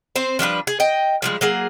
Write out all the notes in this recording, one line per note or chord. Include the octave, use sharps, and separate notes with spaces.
C4 C5
F3 G3 D4 B4
G#4
D#5 G5
F3 G3 G#3
F#3 A#3 G#4